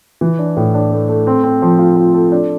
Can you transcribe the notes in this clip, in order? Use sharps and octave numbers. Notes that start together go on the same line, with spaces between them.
E3
D4
A2
D4
A3
A3
C4
C4
F3
F4
F4
A4
D4